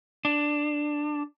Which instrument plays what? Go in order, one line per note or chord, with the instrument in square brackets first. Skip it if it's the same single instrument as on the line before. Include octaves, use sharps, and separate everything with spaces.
[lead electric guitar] D4